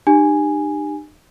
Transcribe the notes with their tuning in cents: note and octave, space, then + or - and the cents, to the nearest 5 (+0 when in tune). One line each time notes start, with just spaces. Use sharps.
D#4 -45 G4 +0 G#5 +0